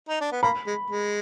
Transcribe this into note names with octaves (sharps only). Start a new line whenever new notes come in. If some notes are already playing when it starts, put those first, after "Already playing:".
D#4
D4
B3
A#3 B5
G#3
G#3